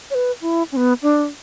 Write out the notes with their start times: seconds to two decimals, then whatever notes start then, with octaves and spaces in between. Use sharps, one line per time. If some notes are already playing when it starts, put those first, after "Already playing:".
0.11 C#5
0.15 B4
0.42 E4
0.72 C#4
0.76 B3
1.03 D4